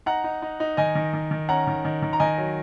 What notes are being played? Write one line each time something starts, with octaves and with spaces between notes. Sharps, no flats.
D#4 F#5 A#5
D#4
D#4
D#4
D#3 D#5 G#5
D#3
D#3
D#3
C#4 F#5 A#5
D#3
D#3
D#3
A#5
D#3 D#5 G#5
F#3